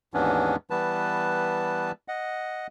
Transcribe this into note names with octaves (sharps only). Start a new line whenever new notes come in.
D#2 G#2 E3 B3 C#4 D4
E3 G3 B3 B4 A5
D#5 F#5